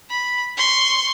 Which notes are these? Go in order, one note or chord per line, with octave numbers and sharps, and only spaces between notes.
B5
C6 C#6